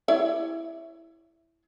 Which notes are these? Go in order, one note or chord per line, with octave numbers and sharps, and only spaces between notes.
E4 C#5 D5